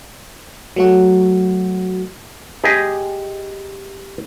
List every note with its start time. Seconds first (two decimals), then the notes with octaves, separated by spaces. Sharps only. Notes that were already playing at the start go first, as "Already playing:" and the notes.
0.76 F#3 A3 F#4
2.64 G4 G#4 D#5